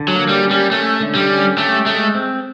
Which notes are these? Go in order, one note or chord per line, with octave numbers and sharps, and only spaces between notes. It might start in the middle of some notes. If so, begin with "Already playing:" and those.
Already playing: D3
F#3
A#3
G3
C#4
G3
A3 C#4
D3
G3
C#4
A3 G4
G#3 A3
C4